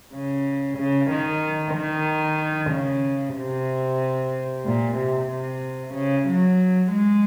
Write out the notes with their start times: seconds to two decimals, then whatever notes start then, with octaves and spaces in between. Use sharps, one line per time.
0.13 C#3
0.78 C#3
1.10 D#3
1.74 D#3
2.71 C#3
3.36 C3
4.65 A#2
4.97 C3
5.31 C3
5.94 C#3
6.28 F#3
6.91 G#3